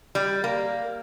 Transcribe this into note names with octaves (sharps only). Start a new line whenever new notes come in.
G3
A#3